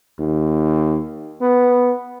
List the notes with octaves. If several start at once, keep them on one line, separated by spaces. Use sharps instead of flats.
D#2
B3